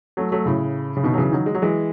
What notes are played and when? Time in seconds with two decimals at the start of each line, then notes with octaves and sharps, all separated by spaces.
0.17 F#3 A3
0.32 F#3 A3
0.46 A2 C#3
0.97 C#3
1.03 B2 D#3
1.14 F#3
1.18 C#3 E3
1.32 D#3 F#3
1.46 G#3
1.55 F#3
1.62 E3 G#3